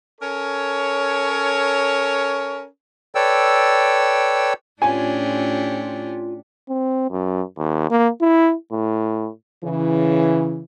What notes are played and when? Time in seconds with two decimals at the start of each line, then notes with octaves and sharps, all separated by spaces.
0.21 C#4 A4 A#4 C#5
3.15 A4 B4 C#5 D5 G5 E6
4.82 A2 C#4 D4 F4 G4 G#5
6.69 C4
7.11 F#2
7.58 D#2
7.91 A#3
8.21 E4
8.72 A2
9.64 C#3 E3